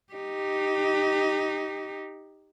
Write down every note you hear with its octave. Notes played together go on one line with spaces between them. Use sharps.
D#4 G4